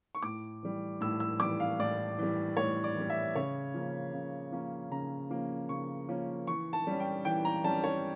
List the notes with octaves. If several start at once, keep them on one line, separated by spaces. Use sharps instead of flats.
C#6
A2 D6
E3 G3
A2 E6
E6
E3 G3 D6
F5
A2 D5
E3 G3
A2 C#5
D5
E3 G3
E5
C#3 C#5
F3 A#3 C#4
C#3
F3 A#3 C#4
C#3 A#5
F3 A#3 C#4
C#3 C#6
F3 A#3 C#4
E3 C#6
A5
G3 C#4
G5
E3 G5
A#5
G3 C#4 A5
C#5